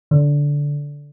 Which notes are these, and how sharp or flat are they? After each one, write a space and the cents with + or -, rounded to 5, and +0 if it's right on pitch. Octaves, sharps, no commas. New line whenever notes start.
D3 -15